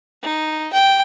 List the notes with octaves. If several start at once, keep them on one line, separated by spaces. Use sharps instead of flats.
D#4
G5